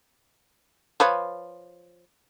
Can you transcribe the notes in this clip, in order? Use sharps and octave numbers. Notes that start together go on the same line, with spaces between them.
F3 B4 C#5